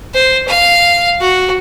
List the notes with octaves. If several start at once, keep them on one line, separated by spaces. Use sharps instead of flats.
C5
F5
F#4